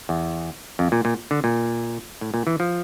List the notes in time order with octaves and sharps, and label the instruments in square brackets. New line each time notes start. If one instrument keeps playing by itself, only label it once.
[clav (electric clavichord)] E2
F2
A#2
A#2
D3
A#2
A2
A#2
E3
F3